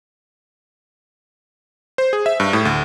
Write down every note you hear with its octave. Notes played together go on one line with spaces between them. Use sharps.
C5
G#4
E5
G2
A2
D2